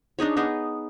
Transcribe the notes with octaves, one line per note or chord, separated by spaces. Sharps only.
D4 D#4 G#4 C#5
B3 D#4 G#4